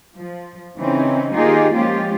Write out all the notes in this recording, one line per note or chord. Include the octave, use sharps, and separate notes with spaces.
F3
C#3 E3 C4 C#4 D#4
D#3 A#3 D#4 F4 G4 G#4
F3 G#3 A#3 C#4 F4 G4